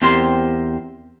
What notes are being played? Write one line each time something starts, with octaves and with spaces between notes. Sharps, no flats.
E2 C4 G4 A#4 C5 C6